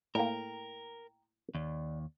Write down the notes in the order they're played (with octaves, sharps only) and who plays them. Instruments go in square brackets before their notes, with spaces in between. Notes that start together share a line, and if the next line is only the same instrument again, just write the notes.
[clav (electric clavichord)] A2 A#3 [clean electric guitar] A#4 [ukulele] G5 A#5
[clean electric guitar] D#2 [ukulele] D5